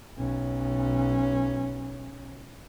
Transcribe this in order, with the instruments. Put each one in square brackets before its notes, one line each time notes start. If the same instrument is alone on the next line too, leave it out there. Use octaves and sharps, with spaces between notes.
[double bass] B1 C#4